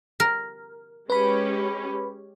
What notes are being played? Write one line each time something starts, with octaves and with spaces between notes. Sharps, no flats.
A#4
G#3 C#4 G4 B4 B5